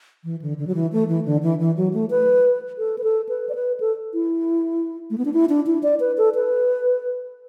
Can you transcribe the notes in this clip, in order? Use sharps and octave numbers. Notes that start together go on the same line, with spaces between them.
E3
D3
D3
F#3
E3
A3
E3
D3
E3
E3
F#3
A3
B4
A4
B4
A4
B4
D5
B4
A4
E4
A3
B3
D4
E4
D4
E4
D5
B4
A4
B4